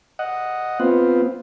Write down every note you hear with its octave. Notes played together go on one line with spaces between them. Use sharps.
D#5 F#5
B3 C4 F4